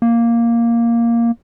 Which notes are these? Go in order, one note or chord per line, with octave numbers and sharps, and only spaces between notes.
A#3